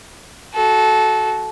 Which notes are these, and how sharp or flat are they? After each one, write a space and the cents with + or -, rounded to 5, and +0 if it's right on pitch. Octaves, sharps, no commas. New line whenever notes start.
F#4 +0 A4 -20